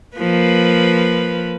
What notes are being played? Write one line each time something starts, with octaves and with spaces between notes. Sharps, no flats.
F3 A#3 B4